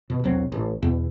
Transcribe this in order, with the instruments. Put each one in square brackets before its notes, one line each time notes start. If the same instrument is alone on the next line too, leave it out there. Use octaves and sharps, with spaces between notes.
[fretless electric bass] B2
E1 B1 F#3 C4
A1
E2 B2